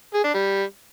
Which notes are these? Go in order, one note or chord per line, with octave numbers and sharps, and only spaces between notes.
G#4
D4
G3